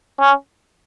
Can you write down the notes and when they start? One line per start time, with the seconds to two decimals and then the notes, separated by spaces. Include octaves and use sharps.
0.20 C#4